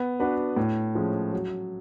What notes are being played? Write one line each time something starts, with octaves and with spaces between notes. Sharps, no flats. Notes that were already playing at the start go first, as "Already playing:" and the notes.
Already playing: B3
D4 F#4 B4
A2
F3 G#3 C#4
F#3